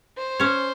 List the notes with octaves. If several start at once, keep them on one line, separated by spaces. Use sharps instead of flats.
C5
C#4 C#5